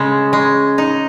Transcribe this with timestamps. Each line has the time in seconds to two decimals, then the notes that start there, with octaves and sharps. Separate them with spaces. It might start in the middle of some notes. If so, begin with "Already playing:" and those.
Already playing: C#3 G#3
0.33 G#3
0.78 D#4